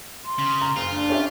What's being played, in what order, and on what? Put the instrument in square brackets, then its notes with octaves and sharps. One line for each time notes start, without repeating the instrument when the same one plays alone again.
[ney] C6
[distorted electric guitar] C#3
[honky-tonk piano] A#5
[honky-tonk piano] F#1 [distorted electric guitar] F4
[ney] D4
[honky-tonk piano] C#4 G4 E5